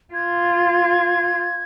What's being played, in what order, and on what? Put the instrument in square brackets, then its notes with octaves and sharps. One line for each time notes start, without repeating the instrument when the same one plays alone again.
[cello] F4 [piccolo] G#6